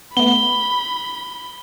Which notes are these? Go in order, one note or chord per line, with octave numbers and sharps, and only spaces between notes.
A3 B3 B5 G7